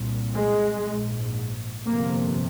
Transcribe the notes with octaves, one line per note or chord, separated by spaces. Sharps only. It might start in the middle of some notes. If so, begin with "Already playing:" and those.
Already playing: C2 A#2
G#3
A#1 G#2
G1 F2 C3 A#3